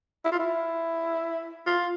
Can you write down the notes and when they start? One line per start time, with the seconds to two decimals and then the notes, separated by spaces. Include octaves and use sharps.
0.25 E4
0.32 F4
0.39 E4
1.67 F4